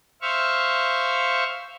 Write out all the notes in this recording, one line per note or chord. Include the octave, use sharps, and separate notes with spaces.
C5 E5 F5 C#6